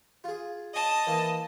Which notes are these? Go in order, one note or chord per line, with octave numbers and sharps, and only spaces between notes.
F4 G#4
D#5 A5
E3 A#3